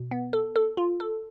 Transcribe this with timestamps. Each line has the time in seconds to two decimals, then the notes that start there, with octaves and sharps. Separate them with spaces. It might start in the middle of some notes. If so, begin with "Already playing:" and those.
Already playing: B2
0.11 B3
0.33 A4
0.56 A4
0.77 F4
1.00 A4